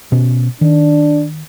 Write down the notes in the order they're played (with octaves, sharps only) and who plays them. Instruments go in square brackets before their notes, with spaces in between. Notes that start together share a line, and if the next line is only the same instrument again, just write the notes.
[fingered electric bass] B2 C#4
[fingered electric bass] D#3 [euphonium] D4